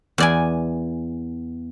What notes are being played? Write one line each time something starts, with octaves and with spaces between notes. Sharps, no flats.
E2 D5 G#5